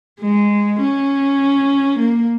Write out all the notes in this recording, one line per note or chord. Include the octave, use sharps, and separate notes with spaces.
G#3
C#4
A#3